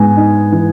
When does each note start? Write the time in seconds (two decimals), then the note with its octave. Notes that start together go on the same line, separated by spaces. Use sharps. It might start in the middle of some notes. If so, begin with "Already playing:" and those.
Already playing: G#2 B3 G#5
0.17 D#4
0.52 E3